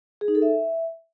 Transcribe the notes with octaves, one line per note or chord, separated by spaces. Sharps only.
G#4
D#4
A4
E5